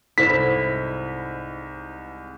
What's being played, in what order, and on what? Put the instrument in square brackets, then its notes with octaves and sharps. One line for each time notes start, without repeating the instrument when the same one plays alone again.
[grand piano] C2 G#2 [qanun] E4 [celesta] A4 C5 E7 [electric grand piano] B6